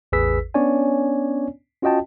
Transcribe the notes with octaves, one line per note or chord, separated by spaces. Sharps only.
A1 E2 G#4 B4 E6 B6
B3 C#4 D4 C#5 D5 G#5
C#4 F4 F#4 D#5 G5 A5